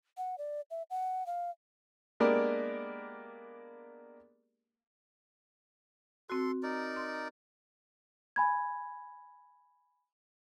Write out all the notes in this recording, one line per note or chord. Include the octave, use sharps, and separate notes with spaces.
F#5
D5
E5
F#5
F5
G#3 A#3 B3 D4 G4 A#4
C4 F#4 A4 C6
D#4 A#4 D5
C6
G#5 B5 G#6